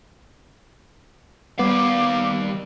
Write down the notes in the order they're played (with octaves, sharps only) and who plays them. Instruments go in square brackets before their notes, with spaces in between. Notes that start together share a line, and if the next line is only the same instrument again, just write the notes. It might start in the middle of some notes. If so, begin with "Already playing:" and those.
[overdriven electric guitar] D#3 F5 [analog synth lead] G3 [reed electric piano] B3 [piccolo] D6